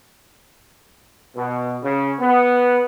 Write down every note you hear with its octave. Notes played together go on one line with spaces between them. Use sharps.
B2
C#3
B3